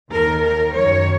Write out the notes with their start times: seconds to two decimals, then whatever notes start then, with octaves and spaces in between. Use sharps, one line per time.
0.12 D#2 D#3 A#4
0.43 A#4
0.74 F#2 D#3 C#5